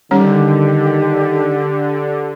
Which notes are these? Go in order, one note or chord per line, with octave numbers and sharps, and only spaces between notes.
D3 D#3 G3 C#4 G4 C#5